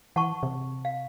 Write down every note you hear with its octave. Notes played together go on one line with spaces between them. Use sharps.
E3 F#5 A5 C#6
C3
F5